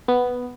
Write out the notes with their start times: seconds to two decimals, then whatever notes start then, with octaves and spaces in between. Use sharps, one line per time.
0.08 B3